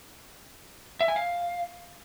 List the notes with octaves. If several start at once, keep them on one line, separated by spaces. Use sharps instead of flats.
E5
G#5
F5